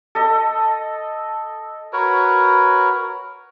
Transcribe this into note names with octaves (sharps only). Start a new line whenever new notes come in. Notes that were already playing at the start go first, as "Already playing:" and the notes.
A4 D#5
F#4 A#4 B4 C#5